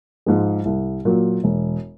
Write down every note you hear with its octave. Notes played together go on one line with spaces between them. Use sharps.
G#2 F3 G#3
C2
A#2 F#3
E1